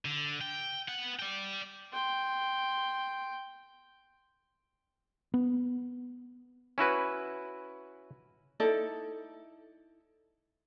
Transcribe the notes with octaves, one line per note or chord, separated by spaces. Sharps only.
D3
G5
B3 F#5
D5 G5
G5 C6
B3
C#4 E4 F#4 B4
D#4 E4 A4 D5